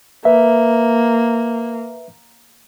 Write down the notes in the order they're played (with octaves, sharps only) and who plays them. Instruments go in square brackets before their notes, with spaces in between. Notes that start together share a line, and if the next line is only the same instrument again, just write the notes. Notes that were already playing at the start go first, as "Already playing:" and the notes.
[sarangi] A#3 [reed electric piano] B4 E5